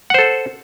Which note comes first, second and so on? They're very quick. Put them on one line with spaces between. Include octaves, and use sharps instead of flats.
F#5 C5 A4